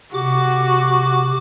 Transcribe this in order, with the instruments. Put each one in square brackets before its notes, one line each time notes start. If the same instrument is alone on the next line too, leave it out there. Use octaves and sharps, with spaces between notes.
[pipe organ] C3 D6 [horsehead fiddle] F#4